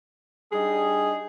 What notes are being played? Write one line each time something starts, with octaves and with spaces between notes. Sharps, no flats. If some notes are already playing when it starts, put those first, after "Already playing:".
G3 D4 D#4 G#4